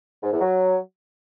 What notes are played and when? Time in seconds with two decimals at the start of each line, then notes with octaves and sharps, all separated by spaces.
0.23 G#2
0.32 E2
0.41 F#3